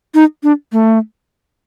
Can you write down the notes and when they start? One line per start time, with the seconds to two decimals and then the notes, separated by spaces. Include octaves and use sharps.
0.15 D#4
0.43 D4
0.72 A3